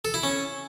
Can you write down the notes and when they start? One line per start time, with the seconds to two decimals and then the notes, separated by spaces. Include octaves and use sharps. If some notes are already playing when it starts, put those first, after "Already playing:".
0.05 A4
0.14 E4
0.23 C#4